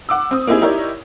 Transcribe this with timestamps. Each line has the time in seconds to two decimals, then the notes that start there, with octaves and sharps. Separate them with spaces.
0.09 F#5 D6 E6
0.31 C4 D#6
0.47 A#3 C4 D#4 E4 G4 G#4
0.61 D#4 E4 G4 A#4 C#5 D5